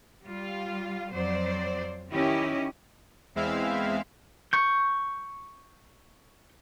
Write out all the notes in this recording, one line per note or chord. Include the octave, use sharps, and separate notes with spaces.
G3 F4
F2 F#3 C5 D5
D#3 C#4 E4 G4 D#5
E2 G#3 C4 E4 E5 F5
C#6 G6